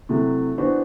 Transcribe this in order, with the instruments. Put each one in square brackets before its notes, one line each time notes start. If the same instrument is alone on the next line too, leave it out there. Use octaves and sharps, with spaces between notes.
[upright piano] C3 F#3 A3 E4
E3 B3 D4 F#4 C5